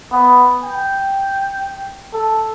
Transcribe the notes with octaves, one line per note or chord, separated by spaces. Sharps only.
B3
G5
A4